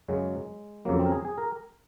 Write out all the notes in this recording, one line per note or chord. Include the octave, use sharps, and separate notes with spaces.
F#2 C#3 F#3 G#3
F2 C#3 F#3 A#3
C4
A#4
G#4
G#4
A#4